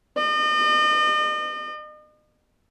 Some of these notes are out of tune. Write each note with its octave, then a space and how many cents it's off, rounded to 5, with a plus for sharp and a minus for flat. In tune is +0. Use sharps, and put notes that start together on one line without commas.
D#5 -40